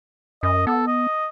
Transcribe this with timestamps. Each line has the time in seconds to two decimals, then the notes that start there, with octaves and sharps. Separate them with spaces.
0.43 F#2 D#5
0.67 B3 A4
0.87 D#5